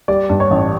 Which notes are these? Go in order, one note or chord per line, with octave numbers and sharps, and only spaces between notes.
G3 D5
G2
C#5
A1